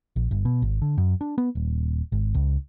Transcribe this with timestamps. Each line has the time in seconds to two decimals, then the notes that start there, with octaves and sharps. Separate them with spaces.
0.16 A#1
0.31 G1
0.45 B2
0.62 G#1
0.82 D3
0.98 F#2
1.21 D4
1.38 B3
1.55 D#1
2.12 G#1
2.34 C#2